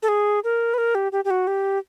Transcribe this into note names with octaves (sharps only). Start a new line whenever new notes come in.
A4
G#4
A#4
B4
A#4
G4
G4
G4
F#4
G4